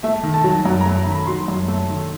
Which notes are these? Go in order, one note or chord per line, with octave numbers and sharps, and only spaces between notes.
A3 E5
D#3
A5
F#3
A5
F#2 A#5
A#5
A3
A#5
D#3
B5
F#3 C6
F#2
A3
D#3